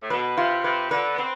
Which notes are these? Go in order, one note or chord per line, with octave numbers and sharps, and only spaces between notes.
A2
B2 B4
C3 F4
C3 B4
D3 B4
B3
C4 B4